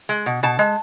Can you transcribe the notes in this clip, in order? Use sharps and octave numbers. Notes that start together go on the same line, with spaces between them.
G#3
B2
B2 A5
G#3